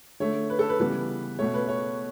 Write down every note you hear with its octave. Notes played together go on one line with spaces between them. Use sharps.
D3 A3 C#5
B4
A4
B4
C#3 E3 G3 B3 B4
B2 A3 C#5
B4
C#5